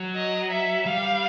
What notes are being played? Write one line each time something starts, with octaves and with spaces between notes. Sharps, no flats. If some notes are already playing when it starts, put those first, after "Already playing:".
Already playing: F#3
D#5
E5
G3 F5